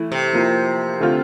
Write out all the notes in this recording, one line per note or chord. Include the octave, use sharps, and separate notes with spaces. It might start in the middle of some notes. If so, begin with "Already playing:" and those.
Already playing: E3 A3 E4
C3
F3 A#3 E4
D3 A3 C4 F4